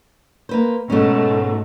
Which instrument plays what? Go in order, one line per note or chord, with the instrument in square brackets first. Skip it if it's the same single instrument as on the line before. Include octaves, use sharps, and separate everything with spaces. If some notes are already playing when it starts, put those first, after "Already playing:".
[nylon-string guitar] A#3 B4 C5
[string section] G#2 A3 [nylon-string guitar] B2 C#4